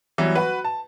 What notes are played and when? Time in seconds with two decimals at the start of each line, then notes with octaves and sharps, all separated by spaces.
0.18 E3 F#3 G3 B3
0.35 F#4 B4
0.64 A5